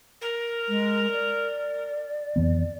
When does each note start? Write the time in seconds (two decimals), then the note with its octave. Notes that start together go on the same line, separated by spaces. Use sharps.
0.21 A#4
0.68 G#3
1.11 D5
2.36 F2 E3 B3